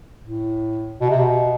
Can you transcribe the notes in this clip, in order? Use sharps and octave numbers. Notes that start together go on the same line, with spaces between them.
A2
B2
C3
B2